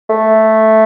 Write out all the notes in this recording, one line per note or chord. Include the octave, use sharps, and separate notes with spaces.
A3